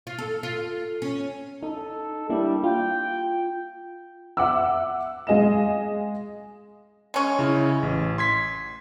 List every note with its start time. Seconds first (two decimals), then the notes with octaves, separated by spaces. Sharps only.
0.07 F4
0.18 A4
0.43 F4
1.02 C#4
1.63 D#4 A4
2.30 G3 A#3 D4 E4
2.64 F4 G5
4.37 E5 F#5 D6 E6
5.27 G#3 G#4 D#5 F5 E7
7.14 G#3 C#4
7.39 C#3 E4
7.83 A1
8.18 C6 G#6 B6